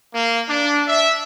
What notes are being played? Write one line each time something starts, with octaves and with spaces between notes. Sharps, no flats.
A#3
D4
E5